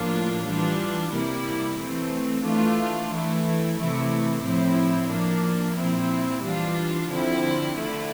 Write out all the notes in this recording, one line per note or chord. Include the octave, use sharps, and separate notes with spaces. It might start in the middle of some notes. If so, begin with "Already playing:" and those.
Already playing: A2 F3 A#3 D4 F4
E3 G3 D4 F4
C3 G3 A#3 E4
E3 A3 C4
E3 A3 D4 F4
E3 A3 E4
C3 E3 A3 E4
A2 F3 C4 E4
F3 A#3 D4
A#2 F3 C4 E4
E3 G3 D4 F4
D3 F3 C4 E4
D3 A3 E4